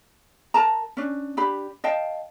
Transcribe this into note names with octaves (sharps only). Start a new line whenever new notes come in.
A#4 A5 A#5
C#4 D4
D4 G4 B5
D#5 F5 G5 A5